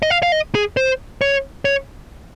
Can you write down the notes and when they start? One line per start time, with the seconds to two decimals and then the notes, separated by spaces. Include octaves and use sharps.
0.02 D#5
0.10 F5
0.23 F5
0.32 D#5
0.55 G#4
0.77 C5
1.21 C#5
1.65 C#5